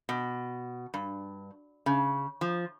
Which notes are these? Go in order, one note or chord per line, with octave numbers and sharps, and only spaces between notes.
B2
G2
C#3
F3